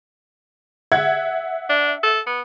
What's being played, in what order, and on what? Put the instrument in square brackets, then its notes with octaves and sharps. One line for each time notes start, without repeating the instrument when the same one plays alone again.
[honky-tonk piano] E5 F#5 G#6
[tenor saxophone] D4
A4
B3